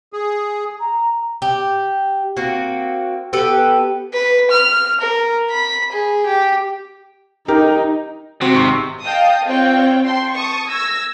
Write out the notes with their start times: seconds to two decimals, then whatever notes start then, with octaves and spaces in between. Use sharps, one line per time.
0.13 G#4
0.80 A#5
1.42 G4
2.36 A#3 C4 F#4
3.33 B3 G4 A4 B4
4.14 B4
4.51 F6
5.01 A#4
5.51 B5
5.93 G#4
6.26 G4
7.48 D#4 G4 A#4 G5
8.41 C3 C4 F#4
8.53 G#1 G#2 C#6
9.03 D#5 F5 G5 A5 D#6
9.44 C4 F4 C#5 D5 G5
10.04 G5 A5 C6
10.35 A5 C#6 D#6
10.70 E6 G#6 A#6